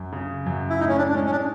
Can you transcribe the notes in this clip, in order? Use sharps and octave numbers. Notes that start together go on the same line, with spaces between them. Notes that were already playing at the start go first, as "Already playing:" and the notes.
Already playing: F#2
C#3
F#2
E4
A2 D#4
C#4
D4
D4
G#3 C#4
C#4
D4